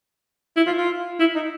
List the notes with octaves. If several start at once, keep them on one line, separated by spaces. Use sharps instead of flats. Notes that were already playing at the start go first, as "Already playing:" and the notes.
E4
F4
F4
E4
D#4